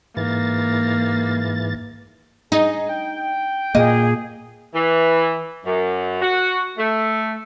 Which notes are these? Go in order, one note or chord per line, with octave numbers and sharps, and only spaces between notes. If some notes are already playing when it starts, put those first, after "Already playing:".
G#2 E3 A#3 A6
D#4 G#4
G5
A#2 A#3 G#4 D#5
E3
F#2
F#4
A3